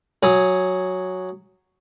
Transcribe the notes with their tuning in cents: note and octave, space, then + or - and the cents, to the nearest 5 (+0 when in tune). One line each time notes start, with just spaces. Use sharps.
F#3 +0 G#4 +0